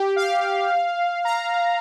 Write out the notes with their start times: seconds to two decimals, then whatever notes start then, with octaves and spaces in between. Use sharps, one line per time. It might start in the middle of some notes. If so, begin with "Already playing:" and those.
Already playing: G4
0.16 F5
1.25 A#5